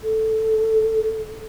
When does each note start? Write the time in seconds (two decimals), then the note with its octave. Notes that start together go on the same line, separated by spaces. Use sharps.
0.03 A4